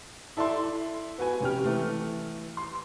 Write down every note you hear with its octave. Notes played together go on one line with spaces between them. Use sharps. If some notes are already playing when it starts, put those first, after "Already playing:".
E4 A4 D5 E5 A5 C6
B3 F#4 B4 G#5
F1 C#4 G4 F6
E3 A3
C6